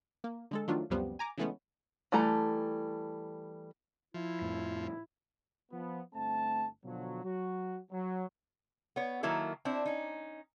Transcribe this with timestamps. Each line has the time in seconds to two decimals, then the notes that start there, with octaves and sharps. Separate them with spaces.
0.24 A#3
0.51 D3 G#3 A4
0.68 D#3 F3 F#3 A3 D4 F4
0.90 C#2 F#2 C3 F3 G3 B3
1.19 G#5 A#5 D6
1.38 C#3 E3 G#3 A3 B3 C#4
2.12 E3 G3 A3 A4 A#5
4.14 F3 E4
4.41 F2 A2
5.72 F3 B3
6.14 G1 A3 C4 A5
6.84 B2 D3 F3 F#3
7.23 F#3 F#4
7.91 F#3
8.96 B3 C#5
9.23 D#3 F#3 A#3 E4 A4 A#4
9.65 C4 D4 E4
9.86 C#4 D#4